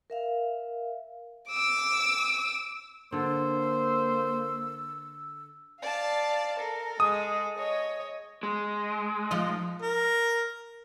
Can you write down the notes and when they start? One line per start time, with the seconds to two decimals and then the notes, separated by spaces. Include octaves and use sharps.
0.10 A#4 E5 F5
1.49 D6 E6
3.12 D3 A#3 A4 C5 E6
5.82 D5 F5 A5
6.59 A4 A#4
7.00 G#3 D#6
7.58 C#5 D#5
8.43 G#3
9.31 F3 D#4 D#5
9.82 A#4